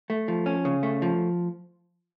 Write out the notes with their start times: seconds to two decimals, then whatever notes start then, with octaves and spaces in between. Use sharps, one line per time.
0.10 A3
0.28 F3
0.46 C#4
0.65 C#3
0.83 A3
1.02 F3